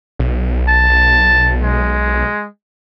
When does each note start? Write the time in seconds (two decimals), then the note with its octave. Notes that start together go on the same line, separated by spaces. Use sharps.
0.19 B1
0.68 A5
1.63 G#3